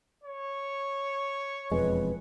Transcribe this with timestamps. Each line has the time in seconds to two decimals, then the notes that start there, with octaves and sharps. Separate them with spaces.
0.24 C#5
1.72 E1 F2 G#3 B4